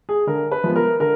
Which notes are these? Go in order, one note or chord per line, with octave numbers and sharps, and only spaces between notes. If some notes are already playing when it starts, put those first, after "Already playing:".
G#4
D3 A#4
B4
F3 G#3 B3
A#4
D3 A#4